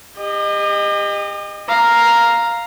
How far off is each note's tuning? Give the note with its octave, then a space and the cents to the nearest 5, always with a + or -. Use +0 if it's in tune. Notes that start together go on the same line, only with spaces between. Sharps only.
G4 +35 D#5 -20
F5 +0 A#5 +0